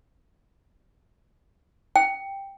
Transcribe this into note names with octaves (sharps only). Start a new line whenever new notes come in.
G5